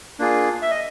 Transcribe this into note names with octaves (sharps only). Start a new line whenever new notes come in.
A#3 D4 F4 G#4
E5
D#5